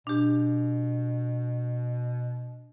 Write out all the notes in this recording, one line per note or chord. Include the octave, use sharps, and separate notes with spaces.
B2 D4 G4